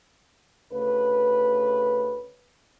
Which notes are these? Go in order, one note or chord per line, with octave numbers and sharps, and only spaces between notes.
D2 C#3 A3 B4